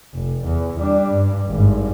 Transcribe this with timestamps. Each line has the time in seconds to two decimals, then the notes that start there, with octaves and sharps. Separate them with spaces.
0.15 F1
0.45 E2
0.80 G3 D4
1.12 G2
1.48 G#1 G2